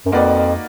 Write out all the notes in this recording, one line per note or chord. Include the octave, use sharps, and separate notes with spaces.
F#2
F2 A#3 D#4 F#4 B4 D5